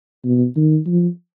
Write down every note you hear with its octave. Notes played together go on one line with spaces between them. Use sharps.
B2
D#3
F3